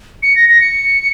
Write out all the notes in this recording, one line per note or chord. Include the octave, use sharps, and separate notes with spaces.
C#7
A#6
A#6
C#7